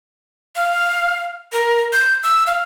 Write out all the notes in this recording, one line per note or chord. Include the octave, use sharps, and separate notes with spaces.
F5
A#4
G6
E6
F5